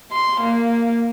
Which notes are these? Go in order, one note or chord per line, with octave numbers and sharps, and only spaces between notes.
C6
A#3